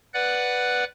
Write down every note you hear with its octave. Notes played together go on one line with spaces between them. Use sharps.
B4 D5 F#5 F#6